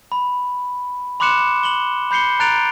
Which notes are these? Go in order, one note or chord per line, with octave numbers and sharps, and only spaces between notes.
B5
B5 C6 D6 F#6 C#7 E7
F#7 G7
B5 G6 C7 C#7 G7
A#5 F#6 A6 D7 F7